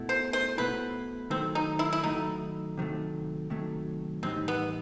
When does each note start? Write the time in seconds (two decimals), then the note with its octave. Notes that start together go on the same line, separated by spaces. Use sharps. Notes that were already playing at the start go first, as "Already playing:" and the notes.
Already playing: B2 A3 E4
0.09 C5
0.33 C5
0.57 B2 A3 E4 B4
1.30 D#3 F#3 A3 C4
1.55 D#4
1.79 E4
1.93 E4
2.04 D#3 F#3 A3 D#4
2.78 C3 D#3 F#3 A3
3.50 C3 D#3 F#3 A3
4.23 A2 E3 G3 C4 D#4
4.48 B3